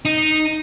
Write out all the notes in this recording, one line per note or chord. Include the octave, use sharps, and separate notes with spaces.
D#4